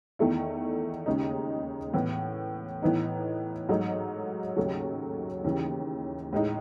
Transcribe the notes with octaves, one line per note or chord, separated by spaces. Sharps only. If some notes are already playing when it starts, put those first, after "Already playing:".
E2 D#3 A3 E4
D#2 C#3 G#3 D#4
A2 E3 B3
A2 E3 B3 D#4
G#2 F#3 A3 D#4
D#2 C#3 F#3 A3 C#4
D#2 C#3 E3
A2 G#3 D#4